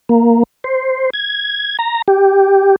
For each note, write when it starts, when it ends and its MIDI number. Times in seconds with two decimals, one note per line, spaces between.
0.09 0.43 58
0.64 1.10 72
1.14 1.77 92
1.79 2.02 82
2.08 2.76 67